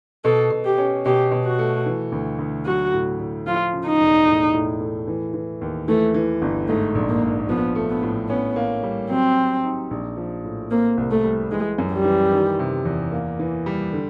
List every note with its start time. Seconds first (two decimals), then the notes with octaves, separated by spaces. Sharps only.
0.25 B2 A4
0.51 B2
0.65 G4
0.78 C#4
1.05 B2 G4
1.32 B2
1.45 F#4
1.58 A3
1.86 E3
2.12 D2
2.39 D2
2.66 F#3 F#4
2.93 A2
3.19 A2
3.46 F3 F4
3.73 C#3
3.87 D#4
4.01 E1
4.27 A2
4.54 A2
4.80 A3
5.07 E3
5.34 E3
5.61 D#2
5.88 E3 A3
6.14 E3
6.42 G1
6.68 G#2 A3
6.95 A#1
7.09 A#3
7.23 A#1
7.49 F3 B3
7.75 A3
7.89 B3
8.03 A2
8.29 B3 C#4
8.56 A#3
8.83 G3
9.10 F#3 C4
9.37 F#3
9.64 D#4
9.91 A#1
10.17 F3
10.44 A2
10.71 A#3 C4
10.97 C2
11.11 A3
11.24 G3
11.52 E3 G#3
11.78 F#2
11.92 G3
12.05 E3
12.32 D#3
12.59 C3
12.85 E2
13.12 A#3
13.39 E3
13.66 G3
13.93 D3